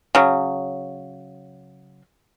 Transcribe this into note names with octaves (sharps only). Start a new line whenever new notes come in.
C#3 F#3